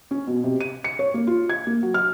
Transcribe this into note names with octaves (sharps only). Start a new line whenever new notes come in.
C#4
B2
C3
D#7
C#7
C#5
A#3
F4
G#6
A#3
F#3
F6